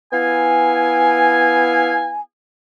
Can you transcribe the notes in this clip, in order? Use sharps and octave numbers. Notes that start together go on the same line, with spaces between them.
B3 E4 F5 G#5